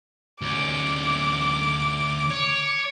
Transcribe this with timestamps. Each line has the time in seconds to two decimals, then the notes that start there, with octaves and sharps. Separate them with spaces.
0.42 D2 C#4 D6
2.31 C#5